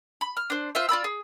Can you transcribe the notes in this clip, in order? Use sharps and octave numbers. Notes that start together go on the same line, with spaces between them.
B5
F6
D4 C5
F4 C5 E5
F4 D5 B5 E6
G#4